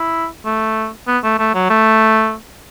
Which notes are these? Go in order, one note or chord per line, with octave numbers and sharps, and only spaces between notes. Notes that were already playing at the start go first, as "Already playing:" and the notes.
Already playing: E4
A3
B3
A3
A3
F#3
A3